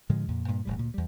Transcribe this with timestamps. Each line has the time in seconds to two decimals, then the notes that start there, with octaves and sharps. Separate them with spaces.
0.09 A2 D3 F3 G#3
0.28 F2 A#2
0.48 G2 A#2
0.65 E1 A2 G3
0.77 D2 A#2
0.94 E2 G3